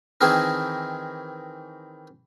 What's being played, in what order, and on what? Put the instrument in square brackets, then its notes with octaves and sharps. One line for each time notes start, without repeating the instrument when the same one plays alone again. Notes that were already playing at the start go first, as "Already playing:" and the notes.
[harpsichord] D#3 E3 C4 E4 G#4 A#4